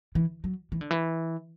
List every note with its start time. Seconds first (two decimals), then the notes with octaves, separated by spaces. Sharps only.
0.15 E3
0.44 F#3
0.72 E3
0.81 D3
0.91 E3